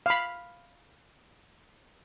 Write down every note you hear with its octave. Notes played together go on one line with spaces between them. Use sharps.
F5 B5